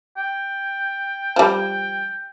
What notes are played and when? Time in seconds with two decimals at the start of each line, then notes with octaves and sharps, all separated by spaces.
0.17 G5
1.36 F3 G3